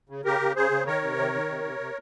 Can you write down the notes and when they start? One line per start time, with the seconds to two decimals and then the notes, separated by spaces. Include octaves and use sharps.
0.09 C#3
0.24 C#3 G4 A#4
0.40 C#3
0.56 C#3 G#4 C5
0.71 C#3
0.86 D#3 A#4 C#5
1.02 C3
1.17 D#3
1.34 D#3
1.49 C3
1.64 C3
1.80 C3